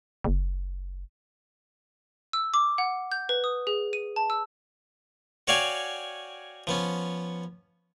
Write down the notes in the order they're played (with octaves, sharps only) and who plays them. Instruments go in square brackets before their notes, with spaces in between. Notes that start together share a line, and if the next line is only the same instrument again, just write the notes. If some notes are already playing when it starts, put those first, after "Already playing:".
[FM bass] F#1
[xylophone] E6
D6
F#5
G6
B4
D#6
G#4
D#7
A5
E6
[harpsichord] F#4 C#5 D5 F5 G5 G#5
F3 B3 C#4